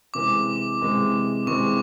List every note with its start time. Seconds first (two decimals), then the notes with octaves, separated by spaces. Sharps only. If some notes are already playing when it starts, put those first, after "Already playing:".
0.14 C3 E3 G#3 D6
0.81 C3 E3 G#3
1.47 C3 E3 G#3 C#6